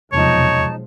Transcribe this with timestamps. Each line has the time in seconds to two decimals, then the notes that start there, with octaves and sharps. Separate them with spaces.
0.13 B1 E2 C3 F3 G#3 D#4 C#5 A5